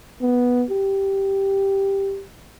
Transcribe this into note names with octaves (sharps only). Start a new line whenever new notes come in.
B3
G4